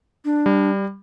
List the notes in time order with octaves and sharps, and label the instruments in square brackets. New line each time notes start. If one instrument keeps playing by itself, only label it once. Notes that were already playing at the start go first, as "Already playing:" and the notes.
[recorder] D4
[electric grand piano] G3